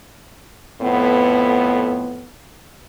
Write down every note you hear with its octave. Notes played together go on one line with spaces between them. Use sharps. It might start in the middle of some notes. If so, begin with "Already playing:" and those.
F2 A2 B3